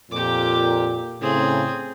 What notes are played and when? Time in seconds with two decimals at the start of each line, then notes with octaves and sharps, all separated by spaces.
0.11 F2 A#2 G4 D6
1.21 A2 C#3 C4 G#4